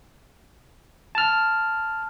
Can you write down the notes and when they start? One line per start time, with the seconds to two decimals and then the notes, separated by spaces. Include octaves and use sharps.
1.15 A5 F6